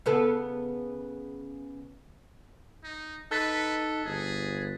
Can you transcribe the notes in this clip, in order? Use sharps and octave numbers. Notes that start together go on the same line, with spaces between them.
C#3 B3 A4
D#4
D#4 A4 B4 F#6 A6 B6
G1 G#4